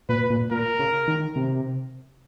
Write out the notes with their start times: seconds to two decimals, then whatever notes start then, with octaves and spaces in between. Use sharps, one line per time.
0.09 A#2 B4
0.30 A#2
0.51 A#2 A#4
0.79 C#3
1.08 D#3
1.36 C3